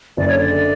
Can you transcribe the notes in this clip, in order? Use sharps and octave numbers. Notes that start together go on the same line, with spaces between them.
F#1 D5
C#5
D3 D5
D3